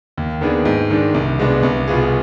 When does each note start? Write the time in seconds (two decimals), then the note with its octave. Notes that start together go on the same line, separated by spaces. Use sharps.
0.17 D#2
0.41 D#3 B3 D4 G#4
0.65 G#2
0.90 D#3 G#3 D4
1.14 C2
1.39 B2 G#3 B3 D4
1.63 C2
1.87 B2 B3 F4 G#4